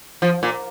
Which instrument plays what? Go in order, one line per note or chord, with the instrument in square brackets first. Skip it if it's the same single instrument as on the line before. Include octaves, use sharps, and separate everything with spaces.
[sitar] F3
A#2